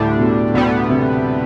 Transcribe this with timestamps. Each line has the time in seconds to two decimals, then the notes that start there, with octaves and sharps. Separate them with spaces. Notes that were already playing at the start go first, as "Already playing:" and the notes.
Already playing: D2 A2 D3 G3 D4
0.18 B2
0.54 D2 B2 D3 G3 B3
0.89 C3